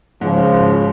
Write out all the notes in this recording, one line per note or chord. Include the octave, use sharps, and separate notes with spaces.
G#2 C#3 F3
G#1
G#1